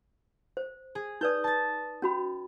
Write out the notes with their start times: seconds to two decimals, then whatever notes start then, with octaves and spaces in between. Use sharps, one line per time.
0.57 C5
0.95 G#4
1.21 D#4 B4 D5 D#6 G6
1.44 A5 A6
2.02 C#4 F#4 B5